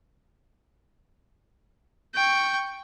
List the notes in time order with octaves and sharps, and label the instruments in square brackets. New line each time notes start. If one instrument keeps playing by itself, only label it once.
[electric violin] G5 C#6